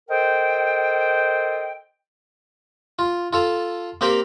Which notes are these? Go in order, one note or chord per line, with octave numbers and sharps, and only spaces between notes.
A4 A#4 C5 D#5 G5
F4
F4 A4 F5
A#3 C4 G4 A#4 F5